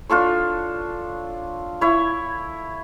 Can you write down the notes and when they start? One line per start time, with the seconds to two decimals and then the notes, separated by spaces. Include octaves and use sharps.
0.09 D4 F4 A4 C#5
1.81 E4 C#5